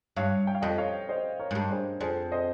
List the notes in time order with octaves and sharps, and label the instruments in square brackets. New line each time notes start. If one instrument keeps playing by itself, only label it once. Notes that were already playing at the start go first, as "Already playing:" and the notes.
[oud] G2 [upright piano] C#5 F5
[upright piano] G5
F5
[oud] F2 [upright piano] D#5 G5
[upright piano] C#5 F5
C5 D#5
A#4 C#5
[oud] G#2
G2
[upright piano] G#4 C5
[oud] F2 [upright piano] G#4 C5
[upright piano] C5 D#5